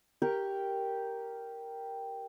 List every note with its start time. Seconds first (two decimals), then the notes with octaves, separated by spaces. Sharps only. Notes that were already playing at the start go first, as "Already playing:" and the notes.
0.22 G4 A#4 G5 C#6